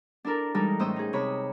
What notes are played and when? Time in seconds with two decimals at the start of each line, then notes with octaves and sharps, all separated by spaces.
0.25 D4 E4 A4 A#4
0.55 E3 G3 G#3 D#4 A4 A#4
0.79 A2 C#4 C5 D#5 D#6 E6
0.96 D#4 G#4
1.13 C3 C#5 B5